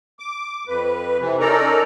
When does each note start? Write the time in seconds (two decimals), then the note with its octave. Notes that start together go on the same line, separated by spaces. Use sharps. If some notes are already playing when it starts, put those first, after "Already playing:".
0.19 D6
0.68 F2 B4
1.20 C3 E3
1.40 C#4 D#4 A4 A#4 D5 A#5